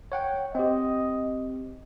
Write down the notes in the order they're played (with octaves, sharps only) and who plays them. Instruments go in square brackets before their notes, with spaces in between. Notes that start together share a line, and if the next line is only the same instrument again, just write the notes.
[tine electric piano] C#5 F#5 G5
[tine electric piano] C4 G4 [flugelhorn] D#5